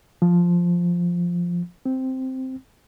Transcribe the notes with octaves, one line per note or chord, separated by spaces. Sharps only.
F3
C4